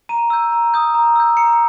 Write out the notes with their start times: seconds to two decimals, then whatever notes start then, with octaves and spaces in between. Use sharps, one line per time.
0.09 A#5 D#7
0.30 E6 G6
0.52 A#5
0.74 D#6 G6
0.95 A#5
1.16 E6 G6
1.37 A#5 C#7